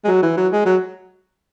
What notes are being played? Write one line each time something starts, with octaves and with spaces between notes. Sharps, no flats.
G#3
F#3
E3
F#3
G#3
F#3